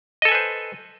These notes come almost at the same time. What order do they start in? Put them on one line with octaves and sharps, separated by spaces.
D#5 A4 G#5 B4 C5